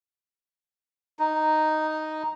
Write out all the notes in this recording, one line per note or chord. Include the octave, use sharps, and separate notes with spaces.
D#4